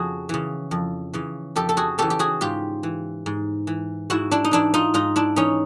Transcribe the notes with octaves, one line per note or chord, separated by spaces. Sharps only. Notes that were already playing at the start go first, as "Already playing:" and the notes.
Already playing: F2 C#3 F#4 G#4
C#3 E3
F2
C#3 E3
F2 G4 A4
A4
F#4 G#4
C#3 E3 G4 A4
G4
F#4 G#4
G#2 F4 G4
E3
G#2
E3
G#2 E4 F#4
D4 E4
D#4
E3 D4 E4
D#4 F4
G#2 D#4 F4
D4 E4
E3 C#4 D#4